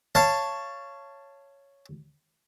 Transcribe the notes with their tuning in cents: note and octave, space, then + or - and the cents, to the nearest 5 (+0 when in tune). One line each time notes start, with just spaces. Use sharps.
C#5 +0 F5 -25 A5 +5